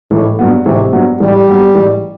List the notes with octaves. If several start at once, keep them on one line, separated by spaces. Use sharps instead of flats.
A1 A2
G2 F#3 B3
A1 C3
G2 F#3 B3
A1 G3
G2 F#3 B3
A1